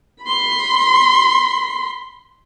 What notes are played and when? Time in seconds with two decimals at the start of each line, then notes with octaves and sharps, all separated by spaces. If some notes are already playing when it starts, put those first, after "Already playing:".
0.23 B5 C6